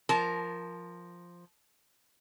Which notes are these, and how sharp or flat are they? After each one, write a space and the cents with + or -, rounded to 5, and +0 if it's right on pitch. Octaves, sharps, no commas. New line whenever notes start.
F3 +0 A#4 +0 A5 -30